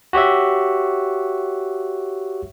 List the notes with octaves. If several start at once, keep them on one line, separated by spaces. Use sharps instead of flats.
F#4 G4 C#5 E5